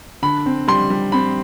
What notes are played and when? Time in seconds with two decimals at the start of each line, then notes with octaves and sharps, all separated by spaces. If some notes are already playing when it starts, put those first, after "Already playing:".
0.22 D3 B5
0.46 C4
0.68 G3 C6
0.90 G3
1.12 C4 B5